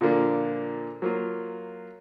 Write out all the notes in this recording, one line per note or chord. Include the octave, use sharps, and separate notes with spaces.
A#2 D3 F3 A#3 D4
F#3 A#3 F4